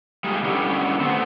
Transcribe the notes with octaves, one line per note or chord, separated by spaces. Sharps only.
G3 G#3 D#4 F4 G4
D3 G3 B3 C#4 E4 G4
A3 B3 C4